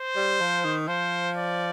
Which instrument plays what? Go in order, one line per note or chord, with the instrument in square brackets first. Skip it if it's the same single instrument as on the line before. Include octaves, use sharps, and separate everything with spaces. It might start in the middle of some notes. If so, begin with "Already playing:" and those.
Already playing: [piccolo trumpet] C5
[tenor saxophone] G3
F3
D#3
[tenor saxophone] F3 [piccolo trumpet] C5
[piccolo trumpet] D5